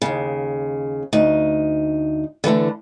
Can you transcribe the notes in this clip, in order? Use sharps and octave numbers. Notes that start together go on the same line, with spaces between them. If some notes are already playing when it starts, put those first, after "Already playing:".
D#2 C#3
D2 D#4
D3 E3 F#3 A3